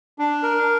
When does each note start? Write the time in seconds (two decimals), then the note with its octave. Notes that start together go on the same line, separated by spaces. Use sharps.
0.19 D4
0.43 A#4